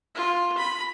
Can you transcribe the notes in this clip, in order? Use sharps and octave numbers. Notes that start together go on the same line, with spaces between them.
F4
B5